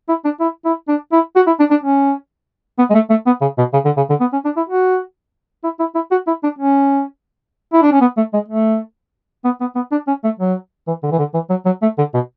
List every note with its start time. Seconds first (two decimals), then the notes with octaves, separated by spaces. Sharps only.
0.09 E4
0.25 D4
0.40 E4
0.65 E4
0.88 D4
1.12 E4
1.36 F#4
1.47 E4
1.60 D4
1.71 D4
1.84 C#4
2.79 B3
2.90 G#3
2.94 A3
3.10 A3
3.27 B3
3.42 C#3
3.58 B2
3.73 C#3
3.85 D3
3.97 C#3
4.10 D3
4.21 B3
4.33 C#4
4.45 D4
4.57 E4
4.69 F#4
5.64 E4
5.80 E4
5.95 E4
6.11 F#4
6.27 E4
6.44 D4
6.59 C#4
7.73 E4
7.83 D4
7.92 C#4
8.01 B3
8.17 A3
8.34 G#3
8.49 A3
9.45 B3
9.61 B3
9.76 B3
9.92 D4
10.08 C#4
10.24 A3
10.40 F#3
10.88 E3
11.03 D3
11.11 E3
11.19 D3
11.34 E3
11.50 F#3
11.66 F#3
11.82 A3
11.98 D3
12.14 B2